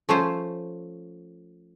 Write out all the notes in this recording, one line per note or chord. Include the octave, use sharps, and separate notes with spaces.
F3 A3 C#4 F4 C5